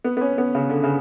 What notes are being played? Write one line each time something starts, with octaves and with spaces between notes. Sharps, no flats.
B3
B3
C#4
B3
C#3
D3
C#3